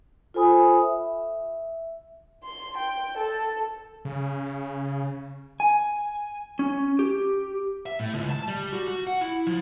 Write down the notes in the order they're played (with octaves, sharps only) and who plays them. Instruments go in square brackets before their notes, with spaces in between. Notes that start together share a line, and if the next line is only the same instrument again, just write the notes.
[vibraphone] F4 A4 C5 G#5 B5 D#6
E5
[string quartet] C6
G5
A4
[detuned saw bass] C#3
[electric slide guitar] G#5
C#4
G4
[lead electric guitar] E5
A2
C#2
A5
G3
F#4
F#4
F#5
E4
F3